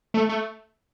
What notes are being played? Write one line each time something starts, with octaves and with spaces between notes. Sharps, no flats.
A3
A3